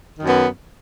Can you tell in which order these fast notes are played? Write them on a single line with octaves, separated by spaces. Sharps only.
D#3 F#2 B3